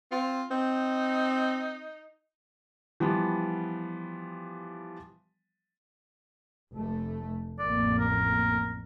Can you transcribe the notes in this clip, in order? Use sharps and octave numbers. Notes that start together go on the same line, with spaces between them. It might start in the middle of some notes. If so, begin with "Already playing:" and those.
C4 F4
C4 D#4
E3 F3 G3 B3
F1 A3
A1 F2 A#3 D5
A#4